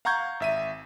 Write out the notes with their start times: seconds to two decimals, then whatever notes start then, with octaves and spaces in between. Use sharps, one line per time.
0.05 F5 F#5 A#5 C#6 G6 G#6
0.40 G#1 E5 D#7